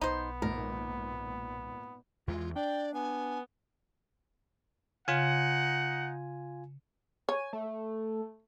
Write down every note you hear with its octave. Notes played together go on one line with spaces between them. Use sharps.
B1 B3 D#4 C5
G#1 A#2 A#4
E2 E3 G#3 F4
D4 D5 G5
B3 G#5
C#3 D#4 F4 F#5 G#5
C#5 G#5
A3